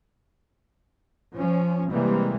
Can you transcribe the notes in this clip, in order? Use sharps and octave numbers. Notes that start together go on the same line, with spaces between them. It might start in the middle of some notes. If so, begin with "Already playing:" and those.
F3 C#4
C3 E3 G3 G#3 A#3